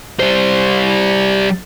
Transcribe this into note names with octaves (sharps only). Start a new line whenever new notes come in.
G3 C5